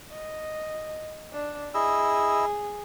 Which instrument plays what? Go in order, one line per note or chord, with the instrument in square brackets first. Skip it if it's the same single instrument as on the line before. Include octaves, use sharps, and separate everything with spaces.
[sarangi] D#5
D4
[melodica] E4 D#5 E6 [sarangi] G#4